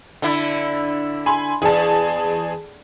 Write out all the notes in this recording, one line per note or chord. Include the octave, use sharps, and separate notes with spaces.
D3 D4 E4
G#5 B5 C6
E2 G#4 A5